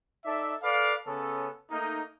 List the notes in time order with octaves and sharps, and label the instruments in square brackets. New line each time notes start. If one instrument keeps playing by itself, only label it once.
[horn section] D#4 A4 D5 E5
A4 B4 D5 F5
C#3 B3 C#4 A4
A3 A#3 D#4